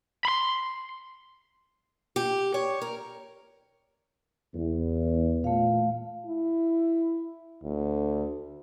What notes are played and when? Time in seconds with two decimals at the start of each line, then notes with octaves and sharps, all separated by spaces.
0.25 B5 C6
2.16 G4
2.54 C#5
2.82 A#4
4.55 E2
5.44 A#2 A3 F5
6.26 E4
7.64 D2